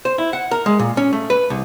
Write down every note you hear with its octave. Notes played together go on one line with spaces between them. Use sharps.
C5
E4
F#5
A#4
G#3
A#2
C#4
A3
B4
C2